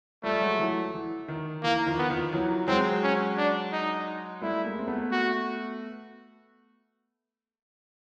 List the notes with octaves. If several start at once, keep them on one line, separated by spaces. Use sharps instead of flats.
F3 G3 A3
F#3 G#3
E3 F#3
E3
D#3
E3 A#3
D#3 F3
B3
D#3 F3
E3 F#3
F#3 G#3 C4
C#4
D4
D#4
G3 A3 E4
G#3 A#3
C4
A3 B3
F#4